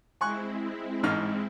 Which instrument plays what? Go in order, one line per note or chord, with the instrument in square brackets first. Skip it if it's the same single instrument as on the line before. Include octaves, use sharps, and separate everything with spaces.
[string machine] G#3 C4 E4 [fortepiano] G#5 C#6 F#6
[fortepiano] A1 G#2 F6